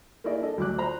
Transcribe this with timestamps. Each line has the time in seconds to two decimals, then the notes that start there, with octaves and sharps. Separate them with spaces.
0.24 A#3 D#4 E4 G#4 D5 D#5
0.41 D4 A4 D#5
0.58 D2 F#3 D6 F#6
0.78 C5 D5 A#5 B5 F#6